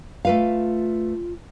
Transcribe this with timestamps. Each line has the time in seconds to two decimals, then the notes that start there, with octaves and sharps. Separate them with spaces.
0.25 A3 F4 B4 F5